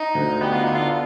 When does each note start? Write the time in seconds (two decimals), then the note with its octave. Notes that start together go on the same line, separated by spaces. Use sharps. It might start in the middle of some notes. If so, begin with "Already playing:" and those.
Already playing: D#4
0.15 D2
0.41 B3 G4
0.52 F4
0.64 D3 D#4
0.75 F4